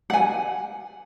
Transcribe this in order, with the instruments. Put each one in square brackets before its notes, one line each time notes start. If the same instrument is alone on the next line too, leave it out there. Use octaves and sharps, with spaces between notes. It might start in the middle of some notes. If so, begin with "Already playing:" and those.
[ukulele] F#5 G#5